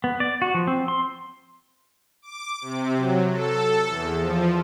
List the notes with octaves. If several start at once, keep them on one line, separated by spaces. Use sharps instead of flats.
B3
D5
F#4
F3
C4
C6
D6
C3
F#3
A4
E2
F3